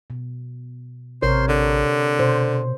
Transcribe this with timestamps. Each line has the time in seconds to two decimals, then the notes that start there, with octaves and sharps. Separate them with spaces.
0.10 B2
1.22 A1 C3 A#4 C5 C#5
1.48 D3
2.19 B2 C5